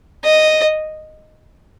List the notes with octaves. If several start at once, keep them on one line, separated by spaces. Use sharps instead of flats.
D#5